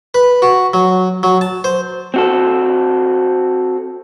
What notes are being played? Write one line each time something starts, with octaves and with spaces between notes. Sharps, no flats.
B4
F#4
F#3
F#3
A5
C5
C4 F#4 A4